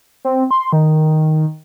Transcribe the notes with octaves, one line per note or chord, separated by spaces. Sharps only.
C4
C6
D#3